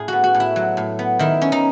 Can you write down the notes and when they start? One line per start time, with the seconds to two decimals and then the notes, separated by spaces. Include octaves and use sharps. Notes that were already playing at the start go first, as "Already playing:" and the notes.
Already playing: A2 G#4
0.08 B3 F#4
0.24 F#4
0.35 A2
0.40 E4
0.56 F#3
0.77 A2
0.99 B3
1.19 D#3 E4
1.42 C#4
1.52 D#4